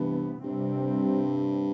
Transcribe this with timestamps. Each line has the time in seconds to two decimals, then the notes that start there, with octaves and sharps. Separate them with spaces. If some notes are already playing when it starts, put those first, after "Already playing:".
Already playing: G2 C3 E3 B3
0.44 G2 C3 G3 C4